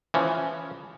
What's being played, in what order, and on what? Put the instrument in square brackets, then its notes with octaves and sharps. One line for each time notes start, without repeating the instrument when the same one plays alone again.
[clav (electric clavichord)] E3 F3 C#4